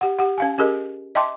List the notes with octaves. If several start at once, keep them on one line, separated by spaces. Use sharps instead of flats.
G4 F#5
G4 F#5
C#4 F5 G#5
C#4 G4 G#4 A#4 D#5
D#5 E5 G5 A5 C6 D6